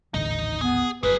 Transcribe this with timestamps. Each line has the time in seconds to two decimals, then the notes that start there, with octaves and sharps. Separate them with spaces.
0.14 D#1 A1 D3 D#4 D#5
0.61 B3 G#4
1.03 F#1 F#2 G#4 A#4 B4